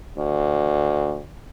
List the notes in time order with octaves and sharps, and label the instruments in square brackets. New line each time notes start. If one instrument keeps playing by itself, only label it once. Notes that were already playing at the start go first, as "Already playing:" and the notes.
[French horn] D2